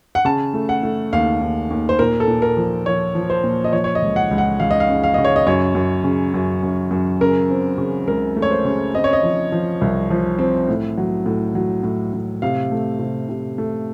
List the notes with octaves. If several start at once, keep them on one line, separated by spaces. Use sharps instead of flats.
F#5
C#3 A5
A3
F#5
A3
D#2 F5
D#2
D#2
C5
A#2 A#4
A4
A#2
A#4
F3
F3 C#5
F3
C5
A#2
D#5
F3 C#5
C#5
D#5
C#2
F#5
C#2
F#5
C#2 F5
D#5
F5
C#3
F5
C#3 D#5
C#5
D#5
F#2 C#5
F#2
C#3
F#2
F#2
F#2
C#3 A#4
C4
C#3
C#2 A#4
A3
C#5
C5
C#3
C4 D#5
C#5
D#5
F3
F3
C2
F3
C4
A2
F#3
A2
F#3
A2
A2
C3 F5
A3
C3
C3
A3